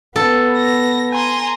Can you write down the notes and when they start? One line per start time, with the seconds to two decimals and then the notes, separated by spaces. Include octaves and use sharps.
0.16 B3 A4
0.57 A#6
1.12 G#5 A#5 C6